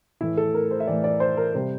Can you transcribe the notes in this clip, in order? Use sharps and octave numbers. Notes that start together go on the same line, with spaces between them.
A2 E3 A3 E4
A4
A#4
C5
E5
A2 E3 A3 D5
D5
C5
A#4
C3 G3 C5